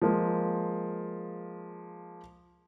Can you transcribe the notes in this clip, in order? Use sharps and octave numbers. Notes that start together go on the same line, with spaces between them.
F3 G#3 A#3